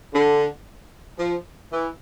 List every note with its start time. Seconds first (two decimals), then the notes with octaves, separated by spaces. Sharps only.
0.14 D3
1.19 F3
1.72 E3